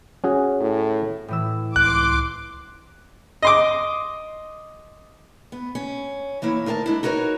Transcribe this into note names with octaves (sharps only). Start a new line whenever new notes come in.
C#4 F#4 G#4
A2
A2 E3 E6
C#2 C6 D6 F#6
D#5 C6 D6
B3
C#4
E3 A#3 E4 C#5
D2 D#4 A#4 F5 A5
G#3 D4 E4
D#4 F#4 A#4 B4 C#5